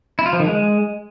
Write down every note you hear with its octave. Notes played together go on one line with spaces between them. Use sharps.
E4
F4
F3
D#3
G#3